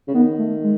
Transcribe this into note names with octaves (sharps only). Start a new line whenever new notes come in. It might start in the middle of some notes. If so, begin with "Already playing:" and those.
C#3
D#3 B3
A3
G#3